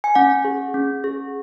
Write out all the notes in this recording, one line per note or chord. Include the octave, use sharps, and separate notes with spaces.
G#5
C#4 F#5
G#4
C#4
G#4